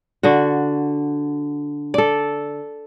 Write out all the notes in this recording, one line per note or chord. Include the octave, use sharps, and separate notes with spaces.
D3 F#4
A4 D5